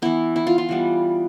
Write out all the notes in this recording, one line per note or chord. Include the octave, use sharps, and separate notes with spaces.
E3 B3 E4
E4
F4
F4
E3 G3 B3